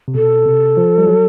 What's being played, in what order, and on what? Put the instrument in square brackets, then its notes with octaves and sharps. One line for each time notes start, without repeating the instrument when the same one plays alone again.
[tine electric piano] C3
[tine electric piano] B2 [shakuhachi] A4
[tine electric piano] C3
F3
G3
F#3